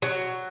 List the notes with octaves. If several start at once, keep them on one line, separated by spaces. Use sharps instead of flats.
F#3